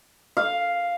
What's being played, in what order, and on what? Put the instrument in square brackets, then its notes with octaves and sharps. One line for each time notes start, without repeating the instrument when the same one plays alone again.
[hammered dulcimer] F5